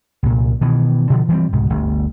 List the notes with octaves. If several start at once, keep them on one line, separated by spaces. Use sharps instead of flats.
C2 A#2
B2 D#3 E3
B2 D3 D#3 F3
E3 F3 G3 C4
C2 G#2 B2
G1 D2